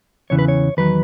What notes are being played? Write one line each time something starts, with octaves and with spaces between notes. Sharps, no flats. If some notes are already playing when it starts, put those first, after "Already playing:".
E2 C#3 E3 C#5
B4
C#5
E2 D#3 F#3 B4